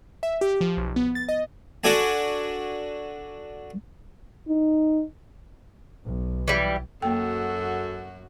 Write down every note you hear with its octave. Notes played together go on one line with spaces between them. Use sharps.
E5
G4
F3
B1
B3
A6
D#5
D4 F#4 A4 D5 G#5 A5
D#4
B1
E3 G3
F#2 A#3 F#4 A4 G5